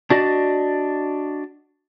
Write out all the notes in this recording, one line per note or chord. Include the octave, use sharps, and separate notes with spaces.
D4 F#4 D5 D#5